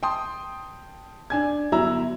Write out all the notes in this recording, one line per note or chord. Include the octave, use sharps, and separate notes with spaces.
G5 A5 C6 D#6
D4 G#5 G#6
G1 F#3 E4 A#5 E6